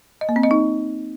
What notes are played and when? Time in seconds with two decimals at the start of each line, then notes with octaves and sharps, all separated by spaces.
0.21 D#5
0.29 A#3
0.36 C4
0.43 D#5
0.51 D#4